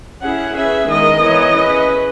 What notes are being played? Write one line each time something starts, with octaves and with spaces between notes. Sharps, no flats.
C#4 E4 G#4 F#5
C#4 G#4 B4 E5
D#3 G#3 B3 E4 A#4 D#5
E3 B3 E4 A#4 C#5
C#4 G#4 B4